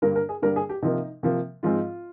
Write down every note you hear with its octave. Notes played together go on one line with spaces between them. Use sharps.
G2 D3 G3 A#3 A#4
A#4
G#4
G2 D3 G3 A#3 A#4
G#4
G4
C3 F3 A#3 D#4
C3 F3 A#3
G#2 F3 G#3 C4 F4